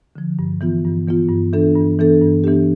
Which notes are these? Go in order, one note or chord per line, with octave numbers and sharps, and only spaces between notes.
D3 F3
G2
E3 B3 F4
G2
E3 B3 F4
G2
E3 B3 D4 A4
G2
E3 B3 D4 A4
G2
E3 B3 D4 G4